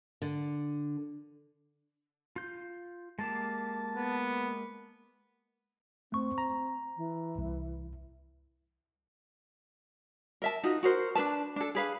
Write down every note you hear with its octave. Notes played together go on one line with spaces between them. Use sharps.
D3
F4 G6
G#3 A#3 G4 A5
B3
A3 C4 C#6
A#5
E3
C2
A#4 E5 A5
D#4 F4 F#4
F#4 A#4 C5
D4 G#4 B4 A5
D4 A4
G#4 B4 F5